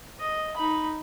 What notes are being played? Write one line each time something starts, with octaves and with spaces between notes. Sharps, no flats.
D#5
D#4 B5